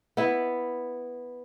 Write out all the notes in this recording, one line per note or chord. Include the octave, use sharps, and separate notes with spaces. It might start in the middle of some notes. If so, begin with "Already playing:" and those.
B3 E4